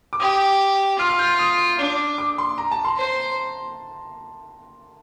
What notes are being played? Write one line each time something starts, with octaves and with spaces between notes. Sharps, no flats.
D6
G4 D#6
F4 F6
F6
G6
D#6
D4
D6
C6
A#5
A5
C6
C5